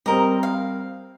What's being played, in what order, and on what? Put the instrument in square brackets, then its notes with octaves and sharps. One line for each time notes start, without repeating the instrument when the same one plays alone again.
[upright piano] G3 C4 [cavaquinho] A#4 D#5
[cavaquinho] F5